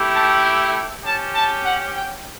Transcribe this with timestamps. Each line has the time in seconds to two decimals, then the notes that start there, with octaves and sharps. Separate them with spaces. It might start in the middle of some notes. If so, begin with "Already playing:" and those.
Already playing: A3 E4 G4
0.14 A5
0.43 G5
1.04 C#4 G4 A5
1.34 A5
1.64 F#5
1.94 G5